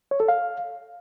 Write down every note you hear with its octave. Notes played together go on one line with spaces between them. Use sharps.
C#5
A4
F5